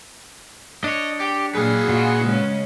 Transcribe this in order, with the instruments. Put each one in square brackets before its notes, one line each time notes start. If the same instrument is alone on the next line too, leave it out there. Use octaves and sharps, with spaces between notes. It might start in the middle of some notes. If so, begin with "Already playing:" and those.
[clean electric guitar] D4 C#5 [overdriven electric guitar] D#5
[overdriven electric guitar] G4
[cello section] A#2 F#3 [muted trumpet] G#4 [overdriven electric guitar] B4 F5
[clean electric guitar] A#2 [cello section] F4 F#4
[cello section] C#3 G#3 C#4